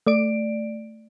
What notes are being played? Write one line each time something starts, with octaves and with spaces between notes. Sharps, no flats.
A3 D5 D7